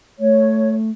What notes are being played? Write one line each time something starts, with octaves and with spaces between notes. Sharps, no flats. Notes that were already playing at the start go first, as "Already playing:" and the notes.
A3 C#5